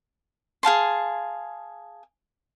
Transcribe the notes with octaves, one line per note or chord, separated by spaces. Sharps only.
G#4 F5 A5 C6